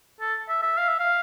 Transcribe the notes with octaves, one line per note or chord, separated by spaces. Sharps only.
A4
E5
E5
F5
E5
F5